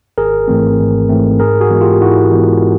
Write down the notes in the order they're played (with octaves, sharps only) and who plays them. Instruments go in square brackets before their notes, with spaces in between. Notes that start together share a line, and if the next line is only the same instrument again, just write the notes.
[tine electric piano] G#1 G#4 A#4
G#2 E3 A3 C4
G#1
G#2 E3 A3 C4
G#2 G#4 A#4
F#4 G#4
E3 G#3 B3
F4 G4
G#2 E4 F#4
E3 G#3 B3